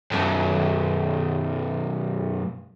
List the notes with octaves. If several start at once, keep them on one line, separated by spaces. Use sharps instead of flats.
B1 F#2